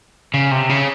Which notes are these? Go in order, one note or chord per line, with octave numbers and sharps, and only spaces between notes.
C#3
C3
C#3